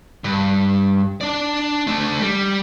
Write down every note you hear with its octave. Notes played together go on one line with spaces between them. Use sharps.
G2
D4 D5
A3 D4
G3